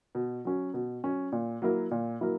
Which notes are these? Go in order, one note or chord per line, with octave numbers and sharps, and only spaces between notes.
B2
F#3 C#4
B2
F#3 C#4
A#2
F#3 A#3 E4 A#4
A#2
F#3 A#3 E4 A#4